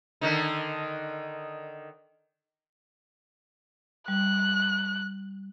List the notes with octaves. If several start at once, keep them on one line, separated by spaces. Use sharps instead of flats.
D3 D#3 D#4
G3 F#6